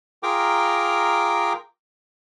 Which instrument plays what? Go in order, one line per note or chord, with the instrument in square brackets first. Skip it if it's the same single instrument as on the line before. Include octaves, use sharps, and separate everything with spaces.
[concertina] F4 G#4 A#4 G5 A#5 D6